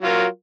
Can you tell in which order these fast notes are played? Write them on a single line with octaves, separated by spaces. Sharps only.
F#3 F4 A#4